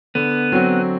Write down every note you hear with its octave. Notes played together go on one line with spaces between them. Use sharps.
D3 B3
F#3 C4 F#4